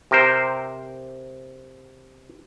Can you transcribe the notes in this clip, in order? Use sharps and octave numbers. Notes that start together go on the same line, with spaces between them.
C3 A#4 C5